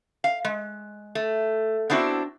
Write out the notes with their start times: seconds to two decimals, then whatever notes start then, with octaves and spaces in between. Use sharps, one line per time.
0.24 F5
0.45 G#3
1.15 A3
1.90 B3 C4 D4 E4 F#4